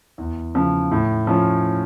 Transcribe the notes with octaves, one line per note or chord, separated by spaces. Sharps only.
E2
C#3 F3
A2
F3 C#4 F4